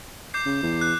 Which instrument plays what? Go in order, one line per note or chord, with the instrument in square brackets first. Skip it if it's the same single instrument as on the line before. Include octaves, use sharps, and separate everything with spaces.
[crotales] D6 G6 C7
[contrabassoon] C#3
E2
[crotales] F#6